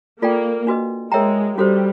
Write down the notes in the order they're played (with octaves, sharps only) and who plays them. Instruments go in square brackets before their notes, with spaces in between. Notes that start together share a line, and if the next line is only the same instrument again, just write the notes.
[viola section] A#3 [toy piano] F4 A4 D5 G5
[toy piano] D4 F#4 B4 D#5
[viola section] G#3 [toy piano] A#4 C#5 E5 G5 A#5
[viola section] G3 [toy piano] C#4 F#4 A4 C5